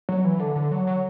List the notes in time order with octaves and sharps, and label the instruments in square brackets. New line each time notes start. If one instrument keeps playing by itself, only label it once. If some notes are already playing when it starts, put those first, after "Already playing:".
[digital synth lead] F#3
E3
D3
D3
F#3
F#3